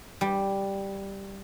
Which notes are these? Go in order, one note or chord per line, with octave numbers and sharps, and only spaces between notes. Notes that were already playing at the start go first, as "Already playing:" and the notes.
G3